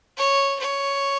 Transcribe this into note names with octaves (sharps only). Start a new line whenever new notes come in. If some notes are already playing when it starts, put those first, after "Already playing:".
C#5
C#5